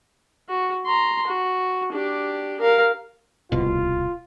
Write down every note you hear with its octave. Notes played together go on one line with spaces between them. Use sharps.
F#4
A#5 C6
F#4
D4 G4
A#4 F5
D1 C2 B2 F4